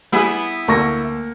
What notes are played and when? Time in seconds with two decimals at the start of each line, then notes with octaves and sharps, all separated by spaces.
0.12 G3 B3 E4 G#4
0.68 D2 A#3 C#6 A#6